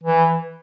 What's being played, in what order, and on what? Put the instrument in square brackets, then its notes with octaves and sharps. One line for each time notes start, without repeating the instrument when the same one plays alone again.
[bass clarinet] E3